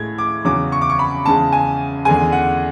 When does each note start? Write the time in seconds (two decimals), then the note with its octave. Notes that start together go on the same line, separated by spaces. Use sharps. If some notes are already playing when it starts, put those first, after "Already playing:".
Already playing: A2 G#3 G#6
0.18 D6
0.45 E2 C#3 F#3 D6
0.72 C#6
0.82 D6
0.90 C#6
0.99 B5
1.26 E2 C#3 G#3 A5
1.53 G#5
2.05 E2 D3 G#3 G#5
2.32 F#5